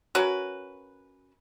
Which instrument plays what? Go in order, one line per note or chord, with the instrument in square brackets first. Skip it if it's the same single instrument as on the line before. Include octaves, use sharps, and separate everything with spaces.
[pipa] C#4 F#4 A#4 B4